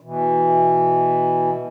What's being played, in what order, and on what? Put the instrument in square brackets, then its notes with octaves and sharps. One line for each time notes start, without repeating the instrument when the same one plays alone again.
[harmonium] B2 E3